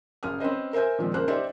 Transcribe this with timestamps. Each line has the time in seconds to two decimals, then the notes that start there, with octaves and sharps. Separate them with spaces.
0.23 F#1 D#6 F6
0.40 C4 C#4 B4 C5 D#5
0.73 A#4 C5 E5 G#5 G6
0.98 A#2 D#3 F3 G#3 C4
1.14 F#1 A#3 C5 F#6
1.28 D#4 G4 C5 D5 E5